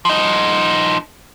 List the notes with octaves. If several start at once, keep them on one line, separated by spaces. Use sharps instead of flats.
F3 D#4